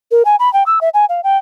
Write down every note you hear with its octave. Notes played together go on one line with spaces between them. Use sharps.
A#4
G#5
B5
G5
E6
E5
G#5
F5
G5